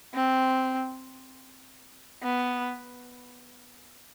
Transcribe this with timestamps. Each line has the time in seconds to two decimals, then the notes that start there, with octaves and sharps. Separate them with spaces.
0.14 C4
2.22 B3